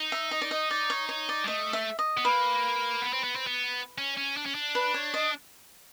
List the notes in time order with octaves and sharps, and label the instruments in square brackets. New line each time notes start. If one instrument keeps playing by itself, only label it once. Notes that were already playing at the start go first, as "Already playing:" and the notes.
Already playing: [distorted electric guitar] D#4
[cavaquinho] E5
D#5
D5
D#5
D5
C#5
C#5
D5
[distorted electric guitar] G#3
[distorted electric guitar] A3 [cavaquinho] D#5
[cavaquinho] E5
D#5
[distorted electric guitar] B3
[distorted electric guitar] A#3 [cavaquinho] B4
[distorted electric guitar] B3
C4
B3
C4
B3
C#4
C#4
D4
C#4
D4
[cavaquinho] B4
C#5
D#5